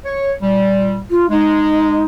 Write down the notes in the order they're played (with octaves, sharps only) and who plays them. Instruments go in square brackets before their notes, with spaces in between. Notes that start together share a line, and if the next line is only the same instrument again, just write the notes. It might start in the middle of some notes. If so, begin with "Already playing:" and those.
[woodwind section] C#5
A#2 G3
[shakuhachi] F4
[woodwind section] G#3 [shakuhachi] D#4